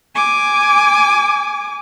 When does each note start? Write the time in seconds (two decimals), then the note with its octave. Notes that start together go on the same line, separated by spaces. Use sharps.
0.16 G#5 D6